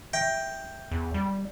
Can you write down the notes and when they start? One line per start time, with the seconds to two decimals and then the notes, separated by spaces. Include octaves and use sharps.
0.13 E5 G5
0.91 E2
1.14 G3